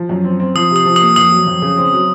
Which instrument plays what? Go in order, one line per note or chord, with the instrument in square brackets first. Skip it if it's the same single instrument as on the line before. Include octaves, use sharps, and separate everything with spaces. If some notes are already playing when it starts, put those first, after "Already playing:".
Already playing: [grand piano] F3
F#2
C4
C4
[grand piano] F3 [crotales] D#6
[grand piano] C3
[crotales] D#6
[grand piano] F3
[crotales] D#6
[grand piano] A#3
[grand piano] F2 [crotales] D#6
[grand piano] F#3
F2
C#3
C4
F#3